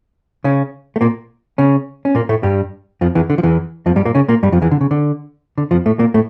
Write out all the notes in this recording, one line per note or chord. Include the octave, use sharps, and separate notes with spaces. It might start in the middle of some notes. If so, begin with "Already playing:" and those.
C#3 C#4
A3
A#2 A#3
C#3 C#4
C#4
A#2 A#3
A2 A3
G2 G3
F2 F3
E2 E3
D3
F3
E2 E3
F2 F3
G2 G3
A#2 A#3
C#3 C#4
A#2 A#3
G2 G3
F2 F3
E2 E3
D3
C#3
D3
D3
F2 F3
A2 A3
A#2 A#3
A2 A3